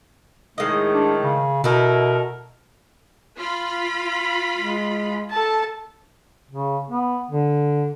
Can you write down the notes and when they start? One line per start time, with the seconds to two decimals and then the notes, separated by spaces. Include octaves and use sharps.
0.58 A2 D#3 G#3 D#5
0.93 D4
1.22 C#3
1.64 B2 D#4 E4 A4 A#4
3.39 F4 B5
4.57 G#3
5.30 A4 A5
6.51 C#3
6.90 B3
7.31 D3